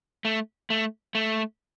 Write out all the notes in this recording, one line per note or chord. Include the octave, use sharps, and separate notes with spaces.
A3
A3
A3